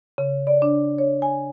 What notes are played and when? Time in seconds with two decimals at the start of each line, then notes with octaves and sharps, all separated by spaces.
0.18 C#3
0.47 D5
0.62 D4
0.98 C#5
1.22 G#5